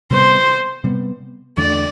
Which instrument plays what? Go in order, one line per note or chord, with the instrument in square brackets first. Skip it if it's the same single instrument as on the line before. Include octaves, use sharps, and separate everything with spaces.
[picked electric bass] C3 G3 B3 [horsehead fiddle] C5
[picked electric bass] C3 G3 B3
[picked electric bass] E2 D3 A3 D4 [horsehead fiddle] D5